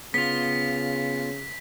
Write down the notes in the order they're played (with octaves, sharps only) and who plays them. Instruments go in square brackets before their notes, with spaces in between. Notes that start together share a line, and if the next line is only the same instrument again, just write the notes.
[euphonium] C#3 [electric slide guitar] B3 F4 [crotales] B6